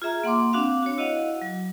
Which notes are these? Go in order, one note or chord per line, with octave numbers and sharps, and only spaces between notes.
F4 G#4 E5 A#5
A#3 F#5 C6 D6
C4 D4 F#4 F5
F#4 C#5
E4 F#4 D#5 F5 F#5
F#3